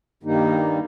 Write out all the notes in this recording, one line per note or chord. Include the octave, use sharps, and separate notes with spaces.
G2 D#3 G3 A#3 D#4